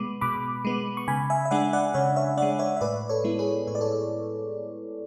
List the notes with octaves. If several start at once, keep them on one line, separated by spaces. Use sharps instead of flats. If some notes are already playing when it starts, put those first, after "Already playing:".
Already playing: B2 G#3 B3 B5 D6
B2 B5 D6
G#3 B3
C#6
C#3 G#5 B5
E5 G#5
E5
G#3 D4 D5 F#5
D5 F#5
C#3 C#5 E5
C#5 E5
G#3 D4 D5 F#5
C#5 E5
E5
A2 B4 D5
A4 C#5
G#3 B3 E4
G#4 B4
A2 C#5
D5
A4 C#5